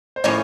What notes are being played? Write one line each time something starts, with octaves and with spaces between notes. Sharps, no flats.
C5
A2 F3 A#3 C#4 C#5